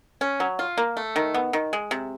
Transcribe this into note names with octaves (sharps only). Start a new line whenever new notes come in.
C#4
F#3
F4
A#3
A3
D#3
B3
D#3
G#3
C3